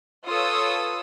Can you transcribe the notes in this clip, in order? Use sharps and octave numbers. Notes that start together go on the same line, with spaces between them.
F4 A4 B4 C#5 D#6 E6